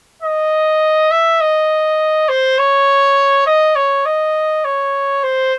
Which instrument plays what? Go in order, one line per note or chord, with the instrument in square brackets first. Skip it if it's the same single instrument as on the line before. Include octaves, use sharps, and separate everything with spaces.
[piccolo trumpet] D#5
E5
D#5
C5
C#5
D#5
C#5
D#5
C#5
C5